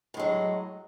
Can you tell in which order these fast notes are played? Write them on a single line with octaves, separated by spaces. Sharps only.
A2 G#3 F#3